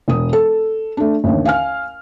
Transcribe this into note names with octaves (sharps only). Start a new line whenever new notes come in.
E1 D#6
A4
A3 D4
A1 D#2 D3
F5 G#5 F6